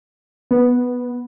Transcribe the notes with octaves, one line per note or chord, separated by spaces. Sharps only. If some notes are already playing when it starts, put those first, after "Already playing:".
B3